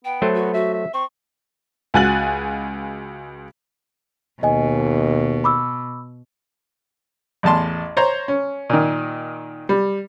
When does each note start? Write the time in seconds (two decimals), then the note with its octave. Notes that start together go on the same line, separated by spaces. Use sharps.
0.05 B3 G5
0.22 F#3 A3 C5
0.35 F#4
0.54 F#4 E5
0.74 E5
0.94 C4 C#6
1.94 C#2 F#4 G#5 F#6 A6 F#7
4.43 D#2 B2 D#5 G#5
5.44 B5 D6 E6
7.43 A1 E2 A5 C6
7.97 C5 C#5 A#5 C6
8.28 C#4
8.70 A#2 D#3
9.69 G3